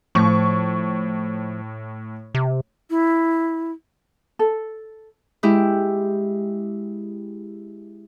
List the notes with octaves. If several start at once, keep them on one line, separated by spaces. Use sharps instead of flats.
A2 F3 C#6
C3
E4
A4
G#3 E4 G4